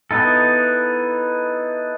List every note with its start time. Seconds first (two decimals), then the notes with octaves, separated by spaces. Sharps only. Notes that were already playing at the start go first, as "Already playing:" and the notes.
0.11 B3 D#4 E4 A4